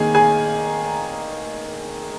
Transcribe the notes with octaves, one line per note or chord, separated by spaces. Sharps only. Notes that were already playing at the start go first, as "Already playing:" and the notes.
Already playing: D#3 A#3 G#4 G#5
G#4 G#5